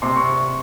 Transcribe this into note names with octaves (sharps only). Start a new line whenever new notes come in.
C3 C6
C#6